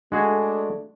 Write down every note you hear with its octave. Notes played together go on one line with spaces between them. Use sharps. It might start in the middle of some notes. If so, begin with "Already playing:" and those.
G#3 A3 D4 F#4 G#4